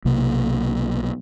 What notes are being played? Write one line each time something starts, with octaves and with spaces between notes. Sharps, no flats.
B1 C3 A#3